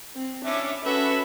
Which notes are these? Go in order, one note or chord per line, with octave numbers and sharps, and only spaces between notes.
C4
C#4 D4 E4 E5 D6
C#4 F#4 A4 B4 E5